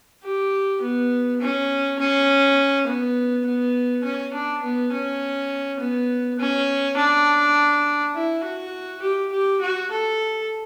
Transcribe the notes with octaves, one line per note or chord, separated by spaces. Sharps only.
G4
B3
C#4
C#4
B3
B3
C#4
D4
B3
C#4
B3
C#4
D4
E4
F#4
G4
G4
F#4
A4